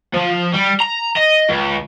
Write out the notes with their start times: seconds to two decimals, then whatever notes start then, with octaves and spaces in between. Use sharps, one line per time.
0.14 F3
0.54 G3
0.80 A#5
1.16 D#5
1.49 C#2